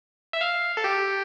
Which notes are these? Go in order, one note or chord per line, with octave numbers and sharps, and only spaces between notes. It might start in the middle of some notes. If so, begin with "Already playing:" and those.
E5
F5
A4
G4